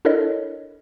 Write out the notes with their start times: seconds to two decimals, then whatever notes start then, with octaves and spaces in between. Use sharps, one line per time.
0.05 D4 E4 A4 A#4 C#5 D#5